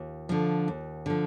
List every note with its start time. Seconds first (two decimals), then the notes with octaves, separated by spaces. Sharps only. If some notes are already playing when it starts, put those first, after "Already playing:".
Already playing: D#2 F4
0.29 D3 F3
0.68 D#2
1.06 D3 F3